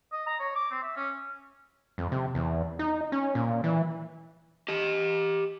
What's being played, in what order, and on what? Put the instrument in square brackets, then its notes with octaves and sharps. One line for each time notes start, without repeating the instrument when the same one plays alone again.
[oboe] D#5
A#5
C#5
D6
C4
E5
C#4
[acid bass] F2
C3
E2
D#4
C#4
A#2
E3
[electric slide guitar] G4 D#5